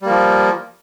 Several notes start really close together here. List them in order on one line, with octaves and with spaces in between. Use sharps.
G3 A#3 F3